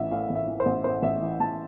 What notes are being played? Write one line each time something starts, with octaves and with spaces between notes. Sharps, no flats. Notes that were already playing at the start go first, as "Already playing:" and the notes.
Already playing: A1 A2 E3 E5
A2 F5
A1
E5
E3
C5
A1
A2 C5
A1 E5
E3
A1 A5